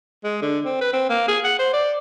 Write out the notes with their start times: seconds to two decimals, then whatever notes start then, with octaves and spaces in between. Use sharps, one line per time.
0.24 G#3
0.42 D3
0.65 C4
0.81 B4
0.93 C4
1.09 A#3
1.28 G#4
1.44 F#5
1.59 C5
1.74 D5